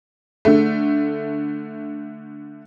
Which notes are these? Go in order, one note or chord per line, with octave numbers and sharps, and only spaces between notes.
D3 A3